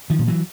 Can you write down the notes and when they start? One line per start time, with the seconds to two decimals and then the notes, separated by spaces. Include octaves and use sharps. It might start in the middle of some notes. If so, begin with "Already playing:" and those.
0.10 D#3 F3
0.19 A#2
0.28 E3 F#3